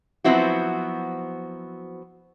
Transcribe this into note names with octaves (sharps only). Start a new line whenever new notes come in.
F3 F#3 B3 C4 E4 F#4